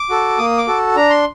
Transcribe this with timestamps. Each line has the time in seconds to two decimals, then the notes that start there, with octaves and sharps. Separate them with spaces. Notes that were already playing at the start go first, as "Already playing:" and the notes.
Already playing: D6
0.10 F#4 A4
0.38 A#3 D#6
0.58 D6
0.67 F#4 A4
0.96 D4 A#5
1.10 C6